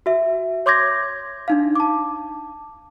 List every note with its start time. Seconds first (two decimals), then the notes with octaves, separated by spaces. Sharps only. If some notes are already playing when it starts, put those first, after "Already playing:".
0.06 F#4 E5
0.66 C#5 C6 D6 G6 G#6 A#6
1.48 D4 D#4 F5
1.75 A5 D6